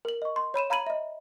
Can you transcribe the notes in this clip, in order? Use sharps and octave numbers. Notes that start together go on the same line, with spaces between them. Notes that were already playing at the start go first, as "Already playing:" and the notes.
A#4 F#7
D#5 C#6
C6
C#5 B5 D#7 E7
F5 A#5 B5 G#6 D#7 F#7
D#5 E5